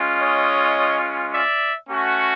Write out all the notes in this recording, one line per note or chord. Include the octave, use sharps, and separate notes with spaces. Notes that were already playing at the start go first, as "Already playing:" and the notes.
Already playing: G#3 C#4 F4
C#5 D#5
D5 E5
A3 C#4 F#4